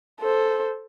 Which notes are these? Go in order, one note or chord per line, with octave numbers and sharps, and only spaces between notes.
A4 C5